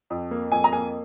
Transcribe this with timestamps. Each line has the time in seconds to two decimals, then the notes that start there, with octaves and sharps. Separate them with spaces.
0.10 F2
0.31 A#3
0.51 F2 G#5
0.64 A#5
0.73 A#3 G#5